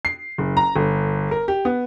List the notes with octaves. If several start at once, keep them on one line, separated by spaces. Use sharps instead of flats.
C7
F#1
A#5
G1
A#4
G4
B3